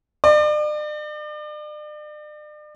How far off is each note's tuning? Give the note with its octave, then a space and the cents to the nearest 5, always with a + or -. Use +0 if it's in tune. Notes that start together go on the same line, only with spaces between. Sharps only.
D5 +40